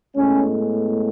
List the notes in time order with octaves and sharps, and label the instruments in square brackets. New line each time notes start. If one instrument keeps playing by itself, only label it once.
[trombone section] A2 G#3 B3 C#4